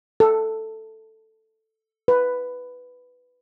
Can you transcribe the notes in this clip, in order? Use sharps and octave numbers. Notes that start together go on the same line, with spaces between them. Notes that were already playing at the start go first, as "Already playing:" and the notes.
A4
B4